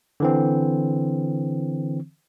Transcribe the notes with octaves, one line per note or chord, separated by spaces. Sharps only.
D3 E3 C4